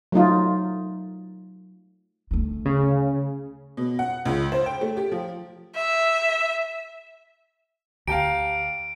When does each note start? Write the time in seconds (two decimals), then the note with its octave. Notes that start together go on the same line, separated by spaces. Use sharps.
0.12 F#3 A3 D#4 F4
2.31 D2 A3
2.66 C#3
3.77 B2
3.99 F#5
4.25 C#2
4.52 C5
4.66 G5
4.81 A3
4.97 G4
5.12 F3
5.75 E5
8.08 D2 G4 F5 G5 A5 A#5 D7